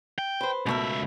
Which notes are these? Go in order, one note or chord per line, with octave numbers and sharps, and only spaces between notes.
G5
B4 C5
C#2 B2 A3 A#4 E5